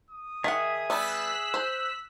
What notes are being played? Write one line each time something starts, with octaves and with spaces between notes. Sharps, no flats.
D#6
D#3 G#4 E5 F#5
G3 B3 E6 F#6 B6
C5